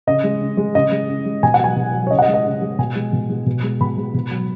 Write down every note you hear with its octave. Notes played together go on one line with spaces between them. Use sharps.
C#3 D#5
G#3
C#3
G#3
C#3 D#5
G#3
C#3
G#3
B2 G#5
F#5
F#3 G#5
B2
F#3
C#5
C#3 D#5
F#5
D#5
G#3
D#5
C#3
G#3
B2 G#5
G#3
B2
G#3
B2
G#3
B2 B5
G#3
B2
F#3